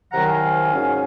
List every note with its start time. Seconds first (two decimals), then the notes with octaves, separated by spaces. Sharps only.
0.12 C2 C3 D#3 F#3 F#5 A#5
0.27 F5 G#5
0.71 G#2 F#3 C#4